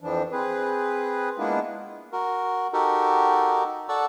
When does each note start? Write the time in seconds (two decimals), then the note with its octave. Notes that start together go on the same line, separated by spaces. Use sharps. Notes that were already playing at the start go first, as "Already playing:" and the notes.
0.01 F2 E3 F3 D4
0.32 C4 G#4 B4
1.38 G#3 A#3 B3 D4 E4 F4
2.13 F#4 A#4
2.73 D#4 F#4 G4 A4 A#4
3.89 A4 D5 F#5 A5 C#6 E6